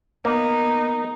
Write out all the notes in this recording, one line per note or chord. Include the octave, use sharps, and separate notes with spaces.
A#3 B3 D#4